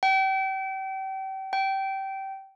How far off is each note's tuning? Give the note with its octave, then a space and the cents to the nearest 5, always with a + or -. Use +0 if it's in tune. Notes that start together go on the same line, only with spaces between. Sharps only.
G5 -35
G5 -20